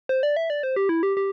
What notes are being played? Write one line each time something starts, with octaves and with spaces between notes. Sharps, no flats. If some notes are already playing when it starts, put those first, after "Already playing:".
C5
D5
E5
D5
C5
G4
E4
G4
G4